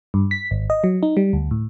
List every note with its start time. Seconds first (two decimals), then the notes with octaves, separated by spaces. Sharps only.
0.14 G2
0.31 B6
0.51 G#1
0.70 D#5
0.84 F#3
1.03 D#4
1.17 G3
1.33 D2
1.51 A2